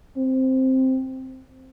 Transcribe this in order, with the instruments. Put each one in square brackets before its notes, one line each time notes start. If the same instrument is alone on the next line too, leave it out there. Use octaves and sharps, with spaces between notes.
[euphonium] C4